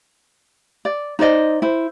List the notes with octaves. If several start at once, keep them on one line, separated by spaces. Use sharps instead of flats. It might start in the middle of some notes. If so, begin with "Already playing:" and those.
D5
D#4 C5 D5 D#5
E4 C5